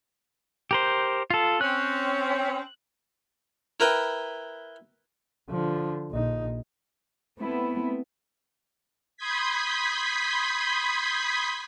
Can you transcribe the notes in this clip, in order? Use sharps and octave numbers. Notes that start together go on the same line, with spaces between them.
G4 A#4 C5
F4 A4
C4 C#4 F#6
E4 A#4 B4 G5
D3 F3
A#1 D#4
A3 B3 C4 E4
B5 C6 D#6 G6 G#6 B6